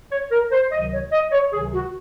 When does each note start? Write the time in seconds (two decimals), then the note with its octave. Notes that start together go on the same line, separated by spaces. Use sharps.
0.11 C#5
0.31 A#4
0.52 C5
0.72 C#2 C3 D#3 F#3 D#5
0.92 C#5
1.12 D#5
1.32 C#5
1.52 C#2 C3 D#3 F#3 G#4
1.72 F#4